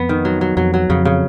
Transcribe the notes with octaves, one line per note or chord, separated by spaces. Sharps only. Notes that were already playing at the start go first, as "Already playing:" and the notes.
Already playing: F2 B3
D#3
F#3
F#3
F2 F#3
F#3
F2 C#3
C#3